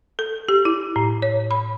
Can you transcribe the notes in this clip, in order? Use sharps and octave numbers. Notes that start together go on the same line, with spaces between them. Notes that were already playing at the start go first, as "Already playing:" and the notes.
A4
G4
E4
A2
C#5
B5